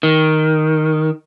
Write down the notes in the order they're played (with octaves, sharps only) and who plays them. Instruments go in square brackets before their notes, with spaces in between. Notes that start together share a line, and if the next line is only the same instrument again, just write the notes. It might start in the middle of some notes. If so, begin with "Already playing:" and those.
[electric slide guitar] D#3